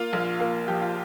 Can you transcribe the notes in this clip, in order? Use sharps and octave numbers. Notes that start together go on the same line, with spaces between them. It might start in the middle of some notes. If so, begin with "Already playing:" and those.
Already playing: A#3 F4
A#1
A#3 F4
F3 G4
F4